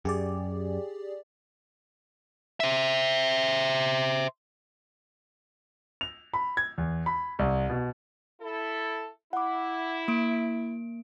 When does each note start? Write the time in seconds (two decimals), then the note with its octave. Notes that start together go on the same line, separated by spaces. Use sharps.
0.05 F#2 G4 G#4 D5
2.60 C5 E5
6.01 F7
6.34 B5
6.57 G#6
6.78 E2
7.06 B5
7.39 C2
7.69 B2
8.41 E4 A4
9.33 E4 F#5 D6
10.08 A#3 D7